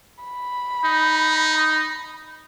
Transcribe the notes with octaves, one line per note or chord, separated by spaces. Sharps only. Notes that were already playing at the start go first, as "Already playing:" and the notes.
B5
D#4